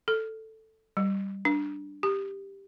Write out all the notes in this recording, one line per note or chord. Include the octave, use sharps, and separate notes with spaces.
A4
G3
D4
G4